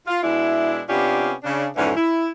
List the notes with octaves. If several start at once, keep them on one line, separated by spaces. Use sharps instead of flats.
F4
B2 G#3 D4 E4
C3 B3 C#4 D4 F4 G4
C#3 D4
F2 G#2 D3 E3 C#4
E4